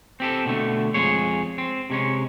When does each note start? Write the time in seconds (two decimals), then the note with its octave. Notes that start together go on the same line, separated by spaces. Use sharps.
0.20 C4 G4 A4
0.45 B2 D3 A3
0.94 F2 G#3 G#4 C#5
1.58 C4
1.90 C3 G#3 C#4